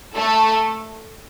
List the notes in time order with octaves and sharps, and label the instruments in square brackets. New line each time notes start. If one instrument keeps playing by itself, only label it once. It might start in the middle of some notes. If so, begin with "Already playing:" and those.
[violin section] A3 A4